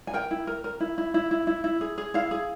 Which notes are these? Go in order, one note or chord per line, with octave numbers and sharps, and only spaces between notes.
G#5
A#4 G5
E4
A#4
A#4
E4
E4
E4
E4
E4
E4
G#4
G#4
E4 F5
G#4